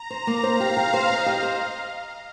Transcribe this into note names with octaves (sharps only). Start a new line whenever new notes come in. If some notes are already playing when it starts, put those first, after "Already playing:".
Already playing: A#5
C5
A#3
C5 F5
G4
G4
C5
C5 D#5
G4
C5